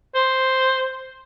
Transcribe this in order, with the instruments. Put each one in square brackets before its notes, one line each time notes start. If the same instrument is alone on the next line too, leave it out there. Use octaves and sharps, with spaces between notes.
[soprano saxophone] C5